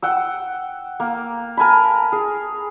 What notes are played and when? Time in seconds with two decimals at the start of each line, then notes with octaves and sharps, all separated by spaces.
0.02 F#5 G5 E6
1.00 A#3
1.57 A#4 G#5 A5 B5
2.12 G#4